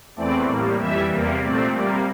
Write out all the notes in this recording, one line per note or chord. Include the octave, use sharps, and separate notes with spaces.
E2 E3 A3 C4 D5
A2 G3 A#3
F2 E3 G3 E5
E2 C3 G3 A#3
A#2 A3 C4 D5
C3 G3 A#3 D5